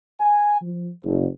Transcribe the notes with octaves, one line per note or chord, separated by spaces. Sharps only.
G#5
F3
F#1